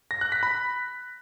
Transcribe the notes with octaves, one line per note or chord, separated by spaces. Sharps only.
A#6
F#6
B6
B5